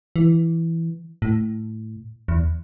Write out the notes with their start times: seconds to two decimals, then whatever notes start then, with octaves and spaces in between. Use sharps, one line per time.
0.16 E3
1.22 A2
2.28 E2